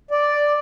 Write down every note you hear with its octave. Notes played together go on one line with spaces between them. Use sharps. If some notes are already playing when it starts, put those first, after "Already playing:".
D5